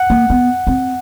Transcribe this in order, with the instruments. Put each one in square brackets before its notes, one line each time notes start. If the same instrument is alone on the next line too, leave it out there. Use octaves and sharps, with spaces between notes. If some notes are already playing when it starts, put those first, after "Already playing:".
Already playing: [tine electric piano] F#5
[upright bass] A#3
B3
C4